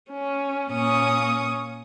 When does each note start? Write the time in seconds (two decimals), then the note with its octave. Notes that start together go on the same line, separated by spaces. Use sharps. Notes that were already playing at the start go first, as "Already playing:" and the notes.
0.10 C#4
0.71 A#2 C#4 C#6 D#6